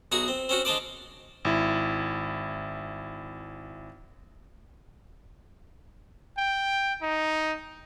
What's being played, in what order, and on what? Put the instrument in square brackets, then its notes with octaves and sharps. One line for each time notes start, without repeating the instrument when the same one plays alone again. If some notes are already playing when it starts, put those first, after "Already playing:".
[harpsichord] B1 F#4 G#4 A#5
C4
C4 C#4 F#4
G#3 D4 C5 D5
[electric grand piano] G#1 E4
[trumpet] G5
D#4